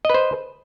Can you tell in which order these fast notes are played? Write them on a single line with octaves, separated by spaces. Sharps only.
D#5 B4 C5